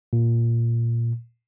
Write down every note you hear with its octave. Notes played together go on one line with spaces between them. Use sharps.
A#2